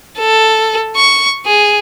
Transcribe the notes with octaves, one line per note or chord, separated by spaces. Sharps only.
A4
C#6
G#4